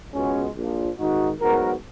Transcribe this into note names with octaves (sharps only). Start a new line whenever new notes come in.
C#2 B2 G#3 B3 C#4
A#1 A#2 F3
G#1 G#2 D#3 D#4 F#4
G#2 F#3 B3 F#4 A#4